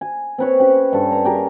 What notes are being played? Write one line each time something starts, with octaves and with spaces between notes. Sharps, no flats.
G#5
C4 B4 C#5
C#4 G4
G2 A4
A#5
G4 G#4 A#4